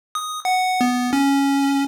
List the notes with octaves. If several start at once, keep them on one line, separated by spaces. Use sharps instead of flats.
D#6
F#5
B3
C#4